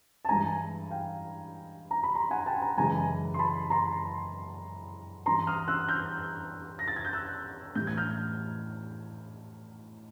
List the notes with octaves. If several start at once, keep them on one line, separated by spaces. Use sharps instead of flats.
A5
G2 E3 G#3 G#5 A#5
F5 G5
A#5
B5
A#5 C6
F#5 G#5
G5 A5
G#5 A#5
F#2 C#3 E3 G#3 G#5 A#5
C6
A5 B5
A#5 C6
G2 E3 G3 A#5 C6
D#6 F6
E6 F#6
F6 G6
A#6
A6
G#6
G6
E6 F#6
A2 E3 G3 G6
G#6
F6 G6